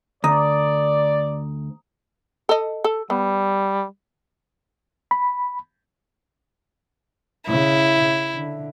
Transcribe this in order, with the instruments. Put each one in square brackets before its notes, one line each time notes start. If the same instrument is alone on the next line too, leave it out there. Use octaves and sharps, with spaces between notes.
[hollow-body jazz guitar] D2 [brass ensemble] D5 [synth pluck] A#5 D#6
[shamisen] A4 D#5
A4
[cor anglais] G3 [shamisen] B3
[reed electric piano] B5
[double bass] C#3 [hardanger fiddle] E4
[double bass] D3